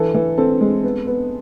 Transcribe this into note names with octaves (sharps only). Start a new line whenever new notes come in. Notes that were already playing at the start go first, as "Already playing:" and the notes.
Already playing: E3 A4
E3
C4 A4
G#3
B3
B3